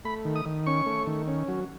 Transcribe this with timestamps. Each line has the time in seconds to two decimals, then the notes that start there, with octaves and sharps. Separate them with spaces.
0.05 A3 B5
0.25 D#3
0.36 D#6
0.45 D#3
0.66 C#4 C#6
0.86 A3
1.07 D#3
1.28 C#4
1.48 F#3